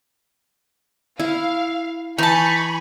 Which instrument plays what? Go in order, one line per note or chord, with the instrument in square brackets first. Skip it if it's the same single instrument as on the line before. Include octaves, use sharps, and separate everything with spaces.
[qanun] E4 [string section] F5
[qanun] E3 [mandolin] D#4 A5 [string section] G#5 B5 C#6